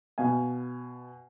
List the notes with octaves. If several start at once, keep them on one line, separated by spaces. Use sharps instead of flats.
B2 F5 G#5